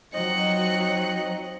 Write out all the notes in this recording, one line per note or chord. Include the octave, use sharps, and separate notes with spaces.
F3 F#3 C4 D#4 D#5 F#6 C#7